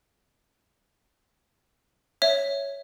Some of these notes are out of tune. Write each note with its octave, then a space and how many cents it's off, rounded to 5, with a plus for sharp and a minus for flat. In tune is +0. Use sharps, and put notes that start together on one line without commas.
C#5 +0 E5 +0